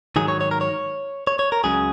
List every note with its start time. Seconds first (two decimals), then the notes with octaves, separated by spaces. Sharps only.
0.16 G#2 D#3 F#3 G#4
0.28 C#5
0.41 C#5
0.51 A#4
0.61 C#5
1.27 C#5
1.39 C#5
1.52 A#4
1.64 C#2 C#3 F#3 G#4